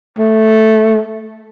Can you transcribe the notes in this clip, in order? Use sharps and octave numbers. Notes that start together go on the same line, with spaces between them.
A3